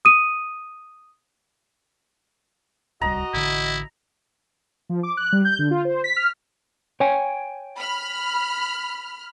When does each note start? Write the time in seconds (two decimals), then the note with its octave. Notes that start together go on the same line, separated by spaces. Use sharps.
0.05 D#6 D#7
3.01 D1 C2 G3 F#4 D#5 A#5
3.34 A1 D3 E4
4.90 F3
5.03 D6
5.17 F#6
5.33 G3
5.45 G6
5.59 D3
5.71 F4
5.85 C5
6.04 B6
6.16 F6
7.00 C#5 G5 G#5
7.78 B5 F6